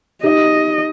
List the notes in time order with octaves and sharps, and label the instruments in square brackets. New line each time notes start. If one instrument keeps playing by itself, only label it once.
[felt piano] D#4 G4 [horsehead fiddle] D#5